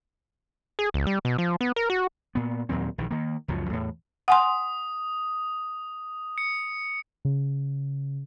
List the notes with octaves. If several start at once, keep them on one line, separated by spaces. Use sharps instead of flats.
G#4
C#2
G3
B2
F3
B3
A#4
F#4
A#2 B3
D#2 A#2 F#3 C4
A#1 D#3 E3
D#3 A#3
C#2 F#2 F3 F#3
E2 A2
F#5 G#5 C6 D#6
C#7
C#3